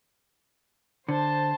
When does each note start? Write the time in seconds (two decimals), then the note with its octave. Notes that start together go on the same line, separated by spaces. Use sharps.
1.08 D3 C5 A5